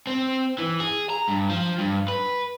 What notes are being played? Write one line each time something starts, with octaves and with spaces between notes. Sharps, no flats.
C4
E3
G#4
A#5
G2
F3
G2
B4